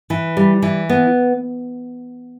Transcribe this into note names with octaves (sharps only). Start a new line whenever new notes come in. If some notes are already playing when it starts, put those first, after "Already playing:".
E3
G3
E3
B3